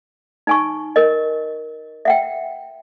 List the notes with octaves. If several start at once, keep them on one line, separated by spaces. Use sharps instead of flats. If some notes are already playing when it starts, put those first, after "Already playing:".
D#4 G#5 C#6
A#4 D#5
E5 F#5 G5